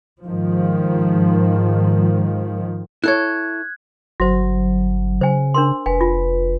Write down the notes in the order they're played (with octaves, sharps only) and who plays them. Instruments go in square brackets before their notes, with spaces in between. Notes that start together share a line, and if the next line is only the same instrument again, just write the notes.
[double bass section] G#2 D#3 F3
[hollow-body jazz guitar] E4 A4 C#5 [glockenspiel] F#6 G#6
[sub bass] G1 [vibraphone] F#3 [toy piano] F#4 C5
[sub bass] C#3 [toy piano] C5 G#5
[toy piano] D4 A#4 C6
[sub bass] F1 [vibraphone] B4 [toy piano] G#5
[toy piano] F4